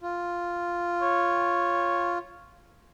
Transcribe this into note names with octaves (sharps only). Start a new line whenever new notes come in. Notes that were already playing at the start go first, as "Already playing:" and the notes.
F4
C#5